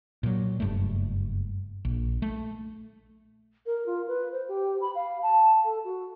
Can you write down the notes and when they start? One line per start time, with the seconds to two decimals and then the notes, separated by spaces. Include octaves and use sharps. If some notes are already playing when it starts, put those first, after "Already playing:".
0.23 A#2 F#3
0.60 F#1 G2 A3
1.85 A#1
2.22 A3
3.66 A#4
3.86 F4
4.08 B4
4.32 C5
4.48 G4
4.81 B5
4.95 F5
5.23 A5
5.65 A4
5.84 F#4